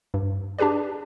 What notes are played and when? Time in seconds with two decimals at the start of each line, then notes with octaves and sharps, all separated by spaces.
0.14 G2
0.58 D4 G4 G#4 B4 D5